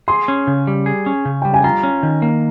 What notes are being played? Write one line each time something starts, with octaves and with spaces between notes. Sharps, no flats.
G#4 C6
C#4
C#3
G3
G#4
C#4
C#3
G3 G5
G#5
F4 A#5
C#4
D#3
A#3